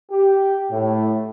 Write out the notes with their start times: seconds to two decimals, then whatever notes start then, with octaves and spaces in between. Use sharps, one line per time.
0.11 G4
0.70 A2